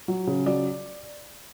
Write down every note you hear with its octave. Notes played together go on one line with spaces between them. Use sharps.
F#3
C#3
F#3 D5